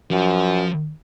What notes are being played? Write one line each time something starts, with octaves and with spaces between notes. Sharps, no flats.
F#2 F3